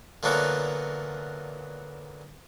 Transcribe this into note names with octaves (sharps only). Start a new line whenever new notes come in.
A#2 D3 E3 F#3 A#3 B3